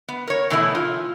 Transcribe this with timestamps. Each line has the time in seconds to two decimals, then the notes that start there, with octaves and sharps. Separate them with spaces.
0.08 B3
0.27 A#4 C#5
0.50 B2 E3 F#3 A3 B3 E4
0.75 F4